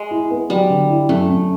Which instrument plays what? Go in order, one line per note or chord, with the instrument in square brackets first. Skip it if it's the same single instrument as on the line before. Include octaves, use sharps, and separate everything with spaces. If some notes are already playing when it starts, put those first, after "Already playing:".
Already playing: [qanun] G#3
[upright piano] E4
B3
[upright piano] F#3 [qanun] G3
[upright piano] D3
E4
[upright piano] F#2 [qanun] A3
[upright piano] F#2